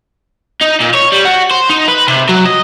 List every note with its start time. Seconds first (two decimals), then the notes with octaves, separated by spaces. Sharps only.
0.62 D#4
0.81 A#2
0.95 C#5
1.12 G3
1.25 F#4
1.51 C5
1.70 D#4
1.88 B4
2.08 C3
2.29 F#3
2.46 D#5